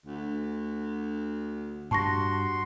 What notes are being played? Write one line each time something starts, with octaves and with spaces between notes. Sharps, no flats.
D2
G2 F#4 A5 C6 C#6 A#6